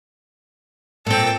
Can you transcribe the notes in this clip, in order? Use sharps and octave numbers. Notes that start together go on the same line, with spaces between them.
A#2 C4 A4 G5